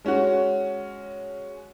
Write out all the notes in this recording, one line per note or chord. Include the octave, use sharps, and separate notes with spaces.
G#3 C#4 F#4